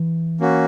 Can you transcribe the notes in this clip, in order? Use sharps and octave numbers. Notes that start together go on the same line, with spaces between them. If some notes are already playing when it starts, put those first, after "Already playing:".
Already playing: E3
A#3 C#4 F#4